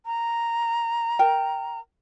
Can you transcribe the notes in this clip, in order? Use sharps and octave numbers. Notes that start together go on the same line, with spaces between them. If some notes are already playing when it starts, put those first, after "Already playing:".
A#5
A#4 G5